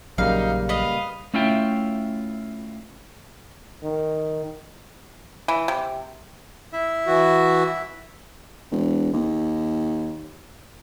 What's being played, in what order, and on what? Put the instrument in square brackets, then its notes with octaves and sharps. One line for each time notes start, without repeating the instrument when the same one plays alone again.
[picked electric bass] A#1 F#3 [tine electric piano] C#3 G3 A#3 [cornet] D#4 [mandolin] F5
[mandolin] B4 D#5 [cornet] F5
[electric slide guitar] A3 C#4 E4 F4 E5 G5
[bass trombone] D#3
[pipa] E3
C3
[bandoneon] E4 E5
[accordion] E3 F#4
[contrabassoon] E1
D#2